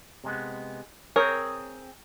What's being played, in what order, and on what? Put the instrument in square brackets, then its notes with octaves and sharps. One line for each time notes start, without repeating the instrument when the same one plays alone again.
[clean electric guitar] C3 G#3 B3
[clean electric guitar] C4 G#4 [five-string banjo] A#4 [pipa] C#5